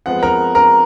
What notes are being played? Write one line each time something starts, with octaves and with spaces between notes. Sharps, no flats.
F2 F3 G#3 B3 F#5
A#4 A#5
A#4 A#5